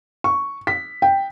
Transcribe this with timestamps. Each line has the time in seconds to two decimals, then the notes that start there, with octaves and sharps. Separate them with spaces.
0.24 C#6
0.67 B6
1.02 G5